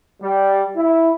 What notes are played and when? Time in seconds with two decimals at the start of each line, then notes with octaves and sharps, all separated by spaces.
0.23 G3
0.77 E4